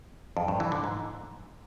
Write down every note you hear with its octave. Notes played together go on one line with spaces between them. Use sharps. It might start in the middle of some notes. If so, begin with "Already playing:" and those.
F2
G2
E3
D3
G#2